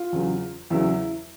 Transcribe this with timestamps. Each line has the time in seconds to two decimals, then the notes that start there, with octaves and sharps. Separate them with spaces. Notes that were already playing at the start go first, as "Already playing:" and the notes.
Already playing: F4
0.13 E2 C#3 F#3
0.70 E2 C#3 F#3 E4